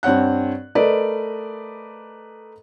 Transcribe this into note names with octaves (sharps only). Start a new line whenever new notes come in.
G2 C4 C#5 F#5 F#6
A3 A#4 B4 D5 D#5